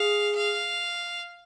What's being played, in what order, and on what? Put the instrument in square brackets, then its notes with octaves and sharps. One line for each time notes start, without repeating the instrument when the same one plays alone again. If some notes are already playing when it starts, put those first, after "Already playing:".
Already playing: [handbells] G#4 [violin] F5
[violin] F5